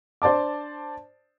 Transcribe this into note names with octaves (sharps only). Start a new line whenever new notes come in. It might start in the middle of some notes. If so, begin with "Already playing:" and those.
D4 C5 D5 A5 D6